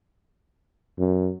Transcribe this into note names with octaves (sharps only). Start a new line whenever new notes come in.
F#2